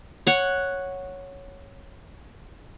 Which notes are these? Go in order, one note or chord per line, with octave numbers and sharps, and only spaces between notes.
C#5 F#5